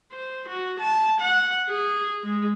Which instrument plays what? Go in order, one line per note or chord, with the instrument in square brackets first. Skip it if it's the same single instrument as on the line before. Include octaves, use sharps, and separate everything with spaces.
[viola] C5
F#4
A5
F#5
G#4
G#3